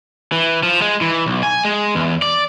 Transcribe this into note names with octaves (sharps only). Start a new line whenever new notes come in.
E3
F3
G#3
E3
B1
G#5
G#3
E2
D5